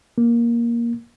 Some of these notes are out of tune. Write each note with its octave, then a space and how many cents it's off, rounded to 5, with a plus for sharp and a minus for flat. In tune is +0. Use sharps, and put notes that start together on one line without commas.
A#3 +10